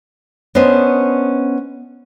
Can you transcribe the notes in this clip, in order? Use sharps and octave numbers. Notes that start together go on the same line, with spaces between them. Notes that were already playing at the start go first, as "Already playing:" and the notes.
B3 C#4 D4 C5 D#5